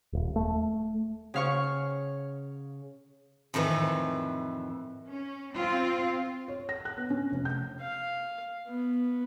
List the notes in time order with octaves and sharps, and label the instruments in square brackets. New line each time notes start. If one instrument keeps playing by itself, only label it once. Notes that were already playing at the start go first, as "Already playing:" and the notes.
[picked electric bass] D#1
A3
[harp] C#3 F5 C#6
[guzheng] F2 A2 D#3 E3
[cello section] C#4
C4 F4
[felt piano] C#5
A#6
F#6
B3
C#4
F1
G6
[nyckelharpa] F5
B3